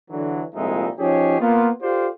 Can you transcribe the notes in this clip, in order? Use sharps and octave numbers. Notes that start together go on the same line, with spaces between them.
D3 E3 F#3
C2 F2 A#2 G#3 D#4 E5
F3 C#4 D#4 G4 G#4 C#5
A#3 B3 F4
F4 G4 A4 C5 D5 F5